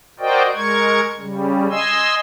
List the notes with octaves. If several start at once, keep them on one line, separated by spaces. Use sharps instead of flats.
F#4 A#4 C5 D5 D#5 G5
G#3 A#4 C#6 G#6
C#3 G3
D#5 G#5 C6 E6